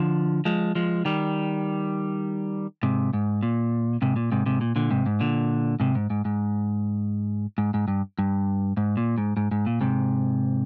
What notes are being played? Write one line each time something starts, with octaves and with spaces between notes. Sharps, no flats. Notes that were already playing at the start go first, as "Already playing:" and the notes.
Already playing: D3 F3
F3 G#3
F3 G#3
D#3 G3
G#2 C3
G#2
A#2
G#2 C3
A#2
G#2 C3
G#2 C3
A#2
A#2 D3
G#2 C3
G#2
A#2 D3
G#2 C3
G#2
G#2
G#2
G#2
G#2
G2
G2
G#2
A#2
G#2
G#2
G#2
A#2
G#2 C3